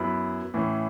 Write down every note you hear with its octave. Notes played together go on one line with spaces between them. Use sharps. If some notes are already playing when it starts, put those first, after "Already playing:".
Already playing: F#2 F#3 B3 E4 B5
A2 E3 C#4